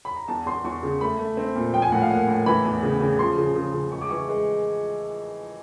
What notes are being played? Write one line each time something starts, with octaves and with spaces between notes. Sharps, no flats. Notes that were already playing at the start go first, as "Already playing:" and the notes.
B5
A#5
E2 A5
E2 C6
E2 C#6
C#3
A3 B5
A3
C4
A#2
F3 G5
G#5
A2 F#5
F5
A#3 F#5
A2
E3 B5
E2
C#3
C#3
F3 C6
C#3
C#3
C#3
G#3 C#6
D6
E3 C#6
G#3